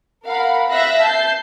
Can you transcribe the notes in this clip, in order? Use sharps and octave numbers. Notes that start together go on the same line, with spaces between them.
A#4 F5 F#5 B5
E5 F5 F#6 A#6
A5 G6 C7